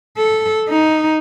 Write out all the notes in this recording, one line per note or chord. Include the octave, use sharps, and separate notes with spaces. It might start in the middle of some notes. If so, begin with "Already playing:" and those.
A4
D#4